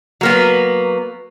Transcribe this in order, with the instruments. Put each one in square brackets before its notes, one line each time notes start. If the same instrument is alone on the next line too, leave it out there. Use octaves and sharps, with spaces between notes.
[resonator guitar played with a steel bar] F#3 A#3 B3